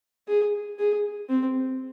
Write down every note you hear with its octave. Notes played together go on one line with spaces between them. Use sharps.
G#4
G#4
C4